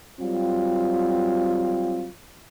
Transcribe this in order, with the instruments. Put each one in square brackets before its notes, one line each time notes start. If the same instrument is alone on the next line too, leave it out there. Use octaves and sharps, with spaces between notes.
[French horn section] F#3 G3 C4 F4